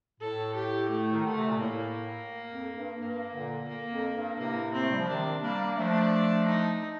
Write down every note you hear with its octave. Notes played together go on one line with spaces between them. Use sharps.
A2 A4
G4
A3
D#3
D3 A3
C3
A#2
A2 A#3
F2
G2
G2 A#3
A#2 D3
A#3
F2
G2
A2 C3 A#3
C4
A3
G3
F3
C3 D#3 D4
G3 A#3 D4
A#3
F3 A3 D4
D#4